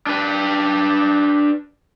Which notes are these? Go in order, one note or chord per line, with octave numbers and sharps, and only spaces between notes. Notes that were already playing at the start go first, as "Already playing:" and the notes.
D4 B4